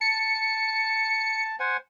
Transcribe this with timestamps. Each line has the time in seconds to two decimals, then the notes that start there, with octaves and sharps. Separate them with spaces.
0.01 A5 C#7
1.60 C5 F#5 G#5